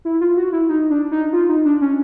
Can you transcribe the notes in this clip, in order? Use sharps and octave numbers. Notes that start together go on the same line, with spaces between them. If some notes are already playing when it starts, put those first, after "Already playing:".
E4
F4
F#4
E4
D#4
D4
D#4
F4
D#4
D4
C#4